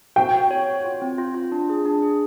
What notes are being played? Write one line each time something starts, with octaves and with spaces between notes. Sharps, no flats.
F#4 G5
F#4
C#5
F#5
F4
C4
F4
F4
D4
G#4
D4
G#4